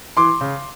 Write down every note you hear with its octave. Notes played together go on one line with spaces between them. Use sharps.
E3 C6 D6
C#3